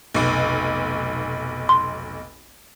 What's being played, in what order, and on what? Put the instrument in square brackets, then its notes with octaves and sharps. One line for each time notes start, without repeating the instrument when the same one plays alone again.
[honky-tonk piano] F1 B1
[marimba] C6